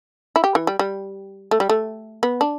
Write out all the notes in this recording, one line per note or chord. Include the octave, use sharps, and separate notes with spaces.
E4
G4
E3
G3
G3
A3
G3
A3
B3
D4